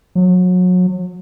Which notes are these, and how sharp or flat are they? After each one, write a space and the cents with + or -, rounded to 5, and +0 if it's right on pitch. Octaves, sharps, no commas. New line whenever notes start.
F#3 -30